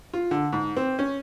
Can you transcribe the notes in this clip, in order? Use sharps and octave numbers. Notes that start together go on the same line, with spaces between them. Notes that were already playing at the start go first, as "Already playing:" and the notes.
F4
D3
G#2
C4
C#4